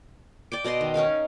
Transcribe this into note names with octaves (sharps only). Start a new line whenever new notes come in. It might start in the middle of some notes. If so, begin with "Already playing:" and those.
D5 G5 D6
B2 D5 D#5 C6
D#3
C#4 D#4 A#4 F5